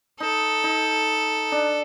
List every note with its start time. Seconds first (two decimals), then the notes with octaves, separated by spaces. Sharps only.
0.20 D#4 A4
0.64 D#4
1.52 D4